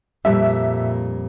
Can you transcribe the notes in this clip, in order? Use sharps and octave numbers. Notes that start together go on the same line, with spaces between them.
F2 A#2 G3 E5